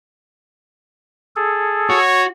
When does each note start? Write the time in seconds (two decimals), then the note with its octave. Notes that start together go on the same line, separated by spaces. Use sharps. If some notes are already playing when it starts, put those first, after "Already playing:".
1.36 G#4 A4
1.90 F#4 C#5